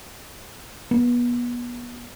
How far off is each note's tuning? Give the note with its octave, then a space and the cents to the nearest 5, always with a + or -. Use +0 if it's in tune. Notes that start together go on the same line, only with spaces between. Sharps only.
B3 -30